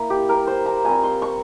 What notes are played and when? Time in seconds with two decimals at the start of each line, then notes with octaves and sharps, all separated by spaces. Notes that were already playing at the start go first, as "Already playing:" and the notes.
Already playing: A#3 E4
0.10 G4
0.29 A#4
0.47 C5
0.66 A#5
0.84 G3 C4 F4 G#5
1.03 C6
1.22 C#6